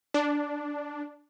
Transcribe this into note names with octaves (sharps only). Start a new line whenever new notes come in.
D4